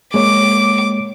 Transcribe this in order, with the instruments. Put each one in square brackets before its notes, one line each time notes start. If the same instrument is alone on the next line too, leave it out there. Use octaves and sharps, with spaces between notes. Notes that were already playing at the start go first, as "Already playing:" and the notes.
[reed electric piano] G#3 A#3 C#5 [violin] D6